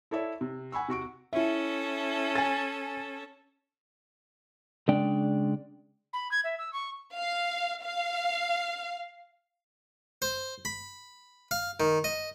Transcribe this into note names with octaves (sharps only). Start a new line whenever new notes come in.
E4 A4 C#5 D5 E5
C3
F#5 G#5 B5 C#6 E6
C3 F#4 C#6 D7
C#4 E4 A4 E5
G#5 A6
C#3 G#3 D4 D5 G5
B5
G#6
E5
E6
C#6
F5
F5
C5
B5
F5
D#3
D#5